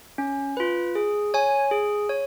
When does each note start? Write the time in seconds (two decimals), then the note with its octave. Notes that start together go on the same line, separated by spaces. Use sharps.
0.18 C#4
0.57 F4 B4
0.95 G#4
1.34 C#5 G#5
1.71 G#4
2.09 C#5